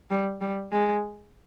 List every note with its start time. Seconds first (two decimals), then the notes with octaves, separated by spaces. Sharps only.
0.10 G3
0.41 G3
0.72 G#3